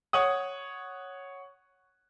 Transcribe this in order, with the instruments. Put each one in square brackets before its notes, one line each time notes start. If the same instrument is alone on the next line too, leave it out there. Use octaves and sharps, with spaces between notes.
[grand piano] C#5 F#5 D#6